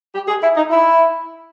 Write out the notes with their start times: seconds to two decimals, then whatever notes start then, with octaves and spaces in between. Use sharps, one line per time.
0.14 G4
0.28 G#4
0.42 E4
0.56 D#4
0.70 E4